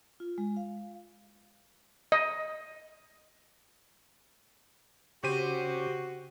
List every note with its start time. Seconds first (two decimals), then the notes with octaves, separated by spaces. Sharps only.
0.20 F4
0.38 G#3
0.57 F5
2.12 D#5
5.24 C#3 C4 F#4 G4 D#7